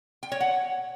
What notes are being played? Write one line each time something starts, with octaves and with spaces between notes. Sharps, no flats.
G5
C#5
F#5